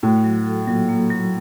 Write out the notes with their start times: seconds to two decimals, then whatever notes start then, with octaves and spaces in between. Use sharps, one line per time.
0.03 A2 F#4
0.24 F#3
0.46 A4
0.67 A#2 F#3
0.89 A#3
1.10 F#3